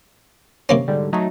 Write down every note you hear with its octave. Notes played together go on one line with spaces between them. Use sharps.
C3 A#3 C#4
G#2 D3 G3
F#3 A3 D#4